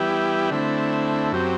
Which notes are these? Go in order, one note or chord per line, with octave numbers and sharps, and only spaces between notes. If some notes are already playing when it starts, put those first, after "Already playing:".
Already playing: E3 G3 B3 E4 G4
D3 A3 C4 E4
F#2 F#3 C4 G4